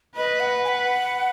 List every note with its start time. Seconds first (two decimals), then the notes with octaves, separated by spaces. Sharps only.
0.16 B4 D#5
0.40 F#5
0.64 G#5
0.68 F#5